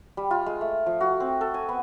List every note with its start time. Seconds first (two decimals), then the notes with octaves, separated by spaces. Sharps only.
0.17 G3
0.31 F4
0.46 G#3
0.61 A3
0.86 F3
1.01 F#4
1.20 C4
1.41 A4
1.54 G#5
1.69 B3